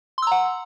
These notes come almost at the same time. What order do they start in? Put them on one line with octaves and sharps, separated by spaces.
C6 E6 A#5 F#5